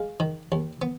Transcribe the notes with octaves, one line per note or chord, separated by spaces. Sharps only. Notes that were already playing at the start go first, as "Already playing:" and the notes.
Already playing: G#3 F5
D#3
D#2
B3